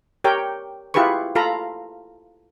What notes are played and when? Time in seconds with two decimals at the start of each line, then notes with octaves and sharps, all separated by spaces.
0.24 G4 A#4 C#5 G5
0.94 E4 F4 G4 G#4 B4 C#6
1.35 F4 A4 F5 A#5 B5